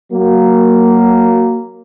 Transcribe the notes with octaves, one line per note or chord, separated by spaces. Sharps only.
F#3 A#3